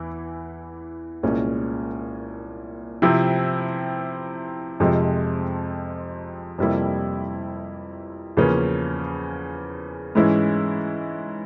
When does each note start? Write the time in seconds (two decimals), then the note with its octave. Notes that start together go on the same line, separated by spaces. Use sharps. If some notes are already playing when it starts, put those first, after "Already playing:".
Already playing: E2 E3 E4
1.23 C2 A#2 G#3 C#4
3.02 C3 F3 C4 E4
4.80 F2 C3 F3 G#3
6.58 F2 C3 G3 A#3 E4
8.37 E2 C#3 F3 A#3 C#4
10.15 G#2 E3 G#3 C#4 E4